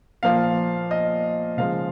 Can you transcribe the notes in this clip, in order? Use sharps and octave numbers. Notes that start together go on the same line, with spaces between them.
A#2 F3 A#3 F5
D#5
C#3 F3 G#3 F5